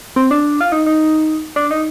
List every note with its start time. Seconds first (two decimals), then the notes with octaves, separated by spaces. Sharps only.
0.16 C4
0.31 D4
0.61 F4
0.72 D#4
0.86 D#4
1.56 D4
1.71 D#4